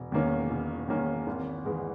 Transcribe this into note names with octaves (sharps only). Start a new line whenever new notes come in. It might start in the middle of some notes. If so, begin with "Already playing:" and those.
Already playing: E1
E2 D#3 A#3 C#4
E1
E2 D#3 A#3 C#4
G#1
G#2 E3 G#3